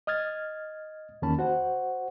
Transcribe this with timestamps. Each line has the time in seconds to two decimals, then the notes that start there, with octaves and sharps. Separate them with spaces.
0.07 D#5 D#6 F6 G#6 A6
1.22 E2 D#3 A#3 C#4 A5 B5
1.39 F#4 C5 F#5